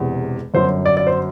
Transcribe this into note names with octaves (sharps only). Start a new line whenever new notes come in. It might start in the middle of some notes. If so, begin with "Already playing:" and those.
Already playing: E1 E2 C3
G1 F#2 F#3 C5
D5
D5
C5